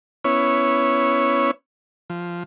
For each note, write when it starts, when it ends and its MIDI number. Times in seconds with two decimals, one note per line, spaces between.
0.25 1.51 59
0.25 1.51 61
0.25 1.51 64
0.25 1.51 73
2.10 2.43 53